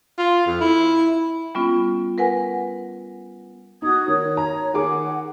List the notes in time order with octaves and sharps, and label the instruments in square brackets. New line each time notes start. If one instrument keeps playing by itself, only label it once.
[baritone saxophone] F4
F2
E4
[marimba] G3 B3 C#4 F4
A#4 B4 F#5 G#5
[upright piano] D#4 [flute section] F#4 D#6 G#6
[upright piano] D#3 [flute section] C#5
[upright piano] A#5
[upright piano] D#3 G#4 D6 [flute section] F#5